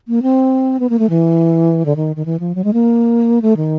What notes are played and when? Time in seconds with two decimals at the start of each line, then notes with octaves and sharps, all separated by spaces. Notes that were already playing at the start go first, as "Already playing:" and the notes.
0.08 A#3
0.22 C4
0.80 B3
0.90 A#3
0.99 A3
1.10 E3
1.86 D3
1.96 D#3
2.16 D#3
2.26 E3
2.40 F3
2.55 F#3
2.64 G#3
2.73 A#3
3.42 A3
3.57 D#3